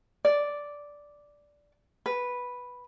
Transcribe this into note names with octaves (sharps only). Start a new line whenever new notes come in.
D5
B4